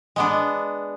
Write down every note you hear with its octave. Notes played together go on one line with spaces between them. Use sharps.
G#3 B3 D4